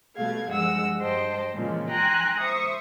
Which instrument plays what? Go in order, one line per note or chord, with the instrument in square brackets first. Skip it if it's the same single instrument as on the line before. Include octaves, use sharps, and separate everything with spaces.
[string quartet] B2 G3 A3 F5 G#6
G2 F3 G#3 F#5 E6
G2 C5 D#5 G5 A5
A#2 C#3 E3 F3 G#3
G5 G#5 A#5 C6 F#6
C5 E5 C#6 D#6